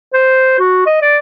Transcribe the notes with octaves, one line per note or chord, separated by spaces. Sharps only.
C5
F#4
D#5
D5